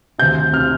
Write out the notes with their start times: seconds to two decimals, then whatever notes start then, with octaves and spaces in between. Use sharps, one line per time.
0.18 D2 C3 G6
0.53 C3 F6